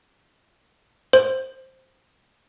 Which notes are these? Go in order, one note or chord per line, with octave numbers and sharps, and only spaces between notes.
C5